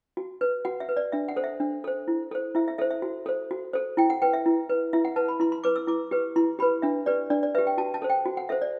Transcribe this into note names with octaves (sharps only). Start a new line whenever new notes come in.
F#4
B4
F#4 F#5
E5
B4
D5
D4 E5
F#5
A4 C5
E5
D4
A4 C5
E4
A4 C5
E4 E5
E5
A4 C5 E5
E5
F#4
A4 C5
F#4
A4 C5
E4 G5
F#5
B4 G5
E5
E4
B4
E4 E5
F#5
B4 A5
B5
E4 C6
C6
B4 D6
E6
E4 D6
G4 B4
E4 C6
G4 B4 B5
D4 E5
G4 B4 D5
D4 D5
D5
G4 B4 E5
G5
F#4 A5
A5
A4 C5
G5
F#4
F#5
A4 C5 E5
D5